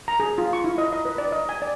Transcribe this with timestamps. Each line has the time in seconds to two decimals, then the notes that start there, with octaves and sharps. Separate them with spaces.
0.08 A#5
0.20 G#4
0.38 F4
0.53 C#6
0.64 E4
0.78 D#5
0.93 D#5
1.05 B4
1.18 D5
1.32 D#5
1.49 G#5
1.62 D5